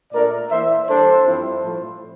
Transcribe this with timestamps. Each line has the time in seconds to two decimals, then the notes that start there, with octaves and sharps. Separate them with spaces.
0.12 A#2 A3 D4 A#4 D5
0.50 E3 A#3 E4 C5 E5
0.88 E3 G3 D4 A4 C5
1.26 G2 F3 C4 E4
1.64 A2 F3 A3